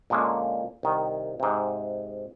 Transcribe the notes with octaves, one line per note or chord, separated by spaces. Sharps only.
A#2 D3 G#3 A#3 C#4
C2 D#3
G#2 C3